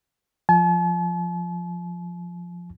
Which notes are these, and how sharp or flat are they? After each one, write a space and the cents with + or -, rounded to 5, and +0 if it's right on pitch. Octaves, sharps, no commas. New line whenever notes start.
F3 +5 A5 -45